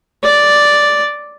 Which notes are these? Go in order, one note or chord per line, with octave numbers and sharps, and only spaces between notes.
D5